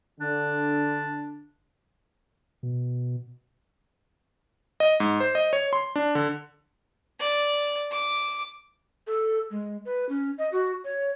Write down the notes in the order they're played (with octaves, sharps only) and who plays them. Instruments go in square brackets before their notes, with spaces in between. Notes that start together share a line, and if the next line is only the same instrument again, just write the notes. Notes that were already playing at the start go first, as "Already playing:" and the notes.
[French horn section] D3 [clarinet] D4
[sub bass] B2
[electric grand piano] D#5
G#2
C5
D#5
C#5
C6
D4
D3
[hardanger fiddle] D5
D6
[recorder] A4
G#3
B4
C#4
D#5
F#4
C#5